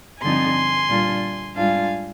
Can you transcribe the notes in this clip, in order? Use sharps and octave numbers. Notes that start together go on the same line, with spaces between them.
G2 D3 F3 C4 D#4 G#5 C6
A#2 G3 D4 F4
G#2 G3 D4 F4 F5 G#5